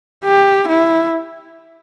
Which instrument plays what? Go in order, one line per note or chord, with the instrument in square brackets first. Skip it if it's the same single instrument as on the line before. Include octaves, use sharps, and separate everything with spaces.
[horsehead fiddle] G4
E4